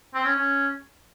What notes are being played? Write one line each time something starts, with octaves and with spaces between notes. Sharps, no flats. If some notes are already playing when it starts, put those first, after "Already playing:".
C4
C#4
C#4